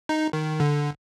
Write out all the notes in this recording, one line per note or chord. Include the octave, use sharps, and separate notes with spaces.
D#4
D#3
D3